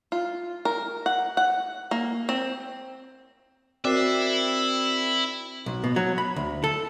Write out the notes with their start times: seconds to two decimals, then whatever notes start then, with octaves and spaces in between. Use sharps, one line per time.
0.12 F4
0.65 A#4
1.06 F#5
1.37 F#5
1.91 A#3
2.29 C4
3.85 C4 E4 F#4 A#4 D5 E5 C7
5.66 B1
5.84 B2
5.96 F#3
6.18 B5
6.36 D2
6.64 A4